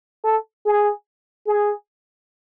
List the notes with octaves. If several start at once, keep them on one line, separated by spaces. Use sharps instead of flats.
A4
G#4
G#4